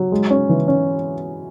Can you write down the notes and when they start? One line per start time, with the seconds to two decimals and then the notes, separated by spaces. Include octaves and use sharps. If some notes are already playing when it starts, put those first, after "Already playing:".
Already playing: F#3
0.12 G#3
0.30 C#4
0.49 E3
0.68 C#4